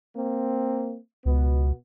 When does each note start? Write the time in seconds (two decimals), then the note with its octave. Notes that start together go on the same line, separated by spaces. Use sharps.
0.16 A#3 C4
1.25 C#2 B2 B3